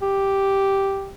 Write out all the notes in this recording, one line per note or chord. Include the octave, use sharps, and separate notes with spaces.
G4